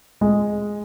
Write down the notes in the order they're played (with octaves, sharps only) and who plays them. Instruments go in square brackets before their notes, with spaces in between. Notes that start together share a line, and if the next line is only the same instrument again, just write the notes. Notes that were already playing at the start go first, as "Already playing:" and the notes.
[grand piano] G#3